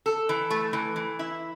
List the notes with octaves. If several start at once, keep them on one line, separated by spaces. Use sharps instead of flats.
A4
E3
A3
E3
E3
E4